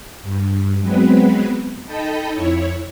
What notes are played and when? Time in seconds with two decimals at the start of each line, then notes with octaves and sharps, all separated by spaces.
0.22 G2
0.81 F#3 G#3 B3 C4 B4
1.85 D#4 A4 D#5 G5 A5 B5
2.33 F2 E4 C#5